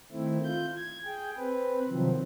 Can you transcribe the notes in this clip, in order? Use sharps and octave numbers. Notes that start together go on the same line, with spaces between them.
D#3 A3 C4 E4
F4 G6
G#6
G#4 G5
C4 B4
C3 D#3 F3 F#3 C4